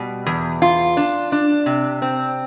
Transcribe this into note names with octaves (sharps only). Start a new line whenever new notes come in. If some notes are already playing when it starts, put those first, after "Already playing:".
Already playing: B2 G3
E2
F4
D4
D4
C3
C4